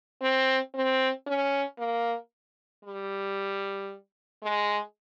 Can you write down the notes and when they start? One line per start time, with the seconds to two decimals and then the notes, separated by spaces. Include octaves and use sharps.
0.21 C4
0.74 C4
1.27 C#4
1.78 A#3
2.84 G3
4.43 G#3